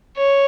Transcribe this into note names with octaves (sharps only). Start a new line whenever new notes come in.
C#5